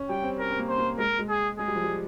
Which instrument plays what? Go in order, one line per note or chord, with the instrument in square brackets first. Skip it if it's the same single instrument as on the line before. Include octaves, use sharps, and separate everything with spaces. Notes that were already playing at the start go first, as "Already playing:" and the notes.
Already playing: [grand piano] C#4
[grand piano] G3 [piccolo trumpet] G5
[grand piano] C4
[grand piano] C#4 [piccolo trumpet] A#4
[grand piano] C4
A#3
[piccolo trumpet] C5
[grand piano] A#3
[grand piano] G#3 [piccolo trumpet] A#4
[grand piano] G#3
[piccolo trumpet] G#4
[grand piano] G#3 [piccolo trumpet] G#4
[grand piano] G3
F3
G3